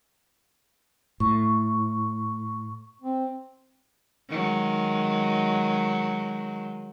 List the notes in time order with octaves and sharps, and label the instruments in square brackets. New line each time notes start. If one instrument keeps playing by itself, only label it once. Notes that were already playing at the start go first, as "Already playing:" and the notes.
[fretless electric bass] A2 [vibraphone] C#6
[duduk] C4
[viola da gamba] D#3 F#3 G#3